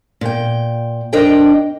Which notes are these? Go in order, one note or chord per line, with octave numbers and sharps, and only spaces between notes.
A#2 G5
F2 D4 A#4 D#5 G5